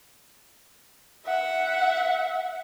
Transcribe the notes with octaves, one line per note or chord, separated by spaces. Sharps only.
E5 F#5